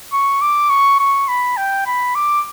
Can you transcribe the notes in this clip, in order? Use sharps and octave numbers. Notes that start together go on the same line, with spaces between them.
C#6
D6
C#6
C#6
B5
G5
B5
D6